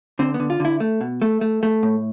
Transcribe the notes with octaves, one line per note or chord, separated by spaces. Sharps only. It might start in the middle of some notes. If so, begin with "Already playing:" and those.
D3 C4
B3
D3
F4
D3 E4
A3
B2
A3
A3
A3
A2